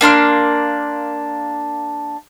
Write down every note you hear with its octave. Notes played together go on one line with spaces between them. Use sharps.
A#3 D4 C6 F6